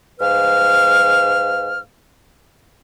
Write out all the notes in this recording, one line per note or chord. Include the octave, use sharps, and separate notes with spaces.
G#2 B4 F5 F6